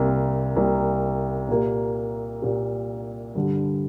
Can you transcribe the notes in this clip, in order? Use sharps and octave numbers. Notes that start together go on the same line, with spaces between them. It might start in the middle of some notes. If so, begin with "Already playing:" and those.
Already playing: C2 C3 A#3
C2 C3 A#3
A#2 A#3 G4
A#2 A#3 G4
G2 D3 G3 D4